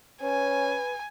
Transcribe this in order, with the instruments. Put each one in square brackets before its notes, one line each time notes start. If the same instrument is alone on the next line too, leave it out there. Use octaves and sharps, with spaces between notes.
[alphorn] C#4 [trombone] B4 [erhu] G#5